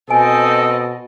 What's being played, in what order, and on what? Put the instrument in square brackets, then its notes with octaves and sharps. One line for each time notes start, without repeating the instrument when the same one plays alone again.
[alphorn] B2 [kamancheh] C4 D#5 [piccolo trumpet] A4 [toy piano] G#5